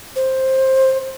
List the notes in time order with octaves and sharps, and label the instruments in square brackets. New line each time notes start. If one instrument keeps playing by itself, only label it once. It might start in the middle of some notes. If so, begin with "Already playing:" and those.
[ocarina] C5